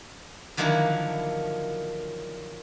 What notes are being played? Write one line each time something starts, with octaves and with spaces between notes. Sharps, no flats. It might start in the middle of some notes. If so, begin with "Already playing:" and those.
D3 D#3 F3 F#3 A#3 E4